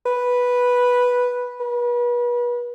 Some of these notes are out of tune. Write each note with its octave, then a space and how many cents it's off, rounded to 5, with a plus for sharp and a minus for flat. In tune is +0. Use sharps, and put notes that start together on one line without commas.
B4 -5
B4 -35